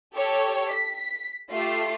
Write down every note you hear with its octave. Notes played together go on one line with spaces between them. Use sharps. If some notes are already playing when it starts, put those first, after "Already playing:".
G4 A4 C#5
B6
A3 F4 G4 C7